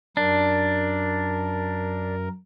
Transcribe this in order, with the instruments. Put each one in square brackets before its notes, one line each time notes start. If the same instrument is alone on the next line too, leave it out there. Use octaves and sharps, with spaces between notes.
[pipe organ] F#2 A#4 [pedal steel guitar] D4